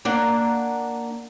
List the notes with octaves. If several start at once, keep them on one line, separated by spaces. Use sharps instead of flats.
A#3 D4 F#5